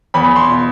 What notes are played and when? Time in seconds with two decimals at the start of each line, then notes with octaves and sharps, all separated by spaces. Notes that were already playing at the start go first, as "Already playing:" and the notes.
0.14 E2 B5
0.36 C6
0.47 B2